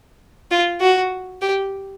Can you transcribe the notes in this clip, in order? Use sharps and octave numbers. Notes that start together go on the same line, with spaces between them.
F4
F#4
G4